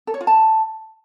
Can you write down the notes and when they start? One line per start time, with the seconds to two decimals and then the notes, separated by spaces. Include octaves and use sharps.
0.07 A4
0.14 C#5
0.21 F4
0.27 A5